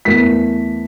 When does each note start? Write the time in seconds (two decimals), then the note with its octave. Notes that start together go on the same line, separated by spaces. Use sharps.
0.05 E2 A3 A#4 B6